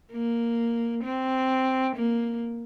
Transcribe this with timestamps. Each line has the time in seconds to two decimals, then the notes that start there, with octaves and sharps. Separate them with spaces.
0.12 A#3
1.04 C4
1.96 A#3